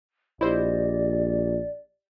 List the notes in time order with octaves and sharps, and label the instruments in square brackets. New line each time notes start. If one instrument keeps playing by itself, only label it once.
[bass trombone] A#1 [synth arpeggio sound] E4 C5 [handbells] G4 D#5 [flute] D5